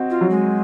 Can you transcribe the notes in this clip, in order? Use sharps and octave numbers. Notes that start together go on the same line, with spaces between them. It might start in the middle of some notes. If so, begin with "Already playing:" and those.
Already playing: C4 D#4 F#4
F4
F#3
G#3